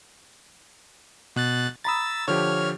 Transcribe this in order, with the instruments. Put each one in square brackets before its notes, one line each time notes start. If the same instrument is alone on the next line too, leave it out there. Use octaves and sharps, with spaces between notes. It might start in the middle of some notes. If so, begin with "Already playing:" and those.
[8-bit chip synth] B2 F#6 A6
[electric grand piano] A#5 B5 D#6 [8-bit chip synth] E6 A6
[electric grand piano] D3 F3 G4 [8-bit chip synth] C#5 F6